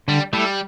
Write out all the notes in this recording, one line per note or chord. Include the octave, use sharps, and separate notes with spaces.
D3 G3
G3 A3 E4 A4